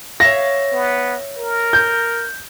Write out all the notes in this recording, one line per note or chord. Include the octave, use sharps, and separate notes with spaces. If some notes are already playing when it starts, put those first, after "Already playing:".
C#5 E5 F5 A#6
B3
A#4
G6